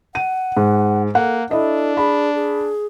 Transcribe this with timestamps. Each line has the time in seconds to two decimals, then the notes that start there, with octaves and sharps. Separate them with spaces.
0.15 F#5 D#7
0.57 G#2
1.15 A#3 A4 F#5
1.51 D4 E4 A4 D#5
1.97 G#4 B5
2.35 G#4